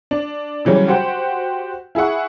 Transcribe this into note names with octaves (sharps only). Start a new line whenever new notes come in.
D4
C#3 E3 F#3 G3
F#4 G4 C5 F#5 G5
E4 G#4 E5 F#5 C#6